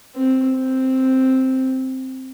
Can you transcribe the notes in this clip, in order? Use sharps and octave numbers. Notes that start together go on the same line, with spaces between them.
C4
C4